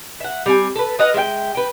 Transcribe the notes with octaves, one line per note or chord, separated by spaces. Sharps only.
E5 F#5
G3 C4 G#5
A4 B4
B4 D#5 F5 F#5
G#3 E5 F5 G5
B4 G5